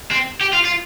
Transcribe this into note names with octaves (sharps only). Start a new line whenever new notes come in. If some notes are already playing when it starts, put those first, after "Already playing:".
C4
G4
F4
F4